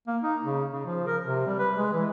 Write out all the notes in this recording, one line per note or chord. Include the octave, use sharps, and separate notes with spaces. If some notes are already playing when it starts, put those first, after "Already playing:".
A#3
D#4
C#3
C#3
F3
A#4
C3
G3
B4
G#3
E3